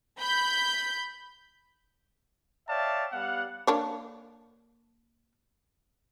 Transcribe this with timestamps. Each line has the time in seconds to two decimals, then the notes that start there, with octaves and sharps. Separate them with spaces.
0.20 B5 G6
2.69 C#5 D5 E5 F5 G5 A5
3.12 G3 B3 F5 F#5
3.67 A#3 D4 C#5